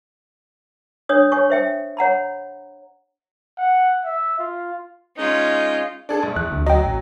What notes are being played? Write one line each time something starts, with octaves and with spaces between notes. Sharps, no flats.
D4 C#5 D#6
C#5 G#5 C#6
C5 E5 G5
C#5 F#5 A#5 B5
F#5
E5
F4
G#3 C#4 D#4 F4
D4 G#4 A4
A#1
E2 F#6
D2
F#3 D#5 G5
A1